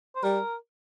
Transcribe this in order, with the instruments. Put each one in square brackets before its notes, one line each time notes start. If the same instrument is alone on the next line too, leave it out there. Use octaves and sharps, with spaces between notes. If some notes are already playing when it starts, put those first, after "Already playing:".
[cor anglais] C5
[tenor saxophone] G3 [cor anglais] A#4